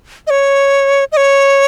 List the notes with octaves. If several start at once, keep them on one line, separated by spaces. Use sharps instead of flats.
D#5
C#5
D#5
C#5